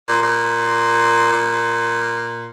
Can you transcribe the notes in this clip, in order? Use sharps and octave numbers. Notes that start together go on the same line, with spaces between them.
A#2
A#2
A#2